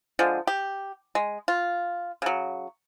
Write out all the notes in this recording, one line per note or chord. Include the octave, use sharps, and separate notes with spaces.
D3 F3 G#3
G4
G#3
F4
C#3 F#3